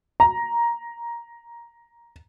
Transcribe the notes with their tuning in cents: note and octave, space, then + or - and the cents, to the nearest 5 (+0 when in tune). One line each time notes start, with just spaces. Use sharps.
A#5 +10